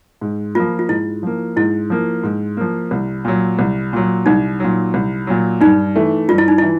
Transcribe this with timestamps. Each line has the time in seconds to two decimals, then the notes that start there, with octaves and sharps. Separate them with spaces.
0.21 G#2
0.55 F3 A#3 F4
0.79 F4
0.89 G#2 E4
1.23 F3 A#3
1.56 G#2 E4
1.90 F3 A#3
2.23 G#2
2.57 F3 A#3
2.91 C2
3.25 A#2 F#3
3.59 C2
3.93 A#2 F#3
4.26 C2 D#4
4.60 A#2 F#3
4.94 C2
5.27 A#2 F#3
5.61 G2 D#4
5.96 E3 A3
6.29 G2 F4
6.38 E4
6.48 D#4
6.58 E3 E4